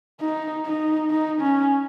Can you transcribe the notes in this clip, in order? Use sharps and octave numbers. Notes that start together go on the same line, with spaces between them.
D#4
D#4
D#4
C#4